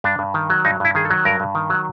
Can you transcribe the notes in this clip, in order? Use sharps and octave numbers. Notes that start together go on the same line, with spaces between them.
G2 D4
G2
D#3
F#3
G2 D#4
G2 E4
D#3 G#4
A4
F#3
G2 A#4
G2
D#3
F#3